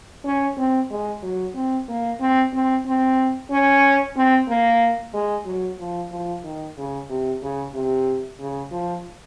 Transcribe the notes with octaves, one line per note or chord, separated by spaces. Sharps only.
C#4
C4
G#3
F#3
C4
A#3
C4
C4
C4
C#4
C4
A#3
G#3
F#3
F3
F3
D#3
C#3
C3
C#3
C3
C#3
F3